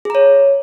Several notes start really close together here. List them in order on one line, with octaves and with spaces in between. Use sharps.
G#4 A#5 C#5